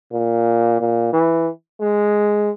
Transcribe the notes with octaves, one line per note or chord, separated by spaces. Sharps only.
A#2
A#2
E3
G#3